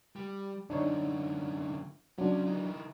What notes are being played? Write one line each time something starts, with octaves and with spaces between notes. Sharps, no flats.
G3
F#2 D3 D4 D#4 C#5
F#3 C#4 D4 F4
E3 D#4